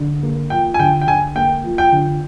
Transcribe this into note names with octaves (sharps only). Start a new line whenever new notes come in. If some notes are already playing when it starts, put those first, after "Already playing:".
Already playing: D3
A#3
F3 G5
G#5
D3 G5
G5
D3 G#5
A#3 G5
F3
G5
D3